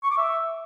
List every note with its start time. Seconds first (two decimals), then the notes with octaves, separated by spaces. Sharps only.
0.03 C#6
0.11 D6
0.18 E5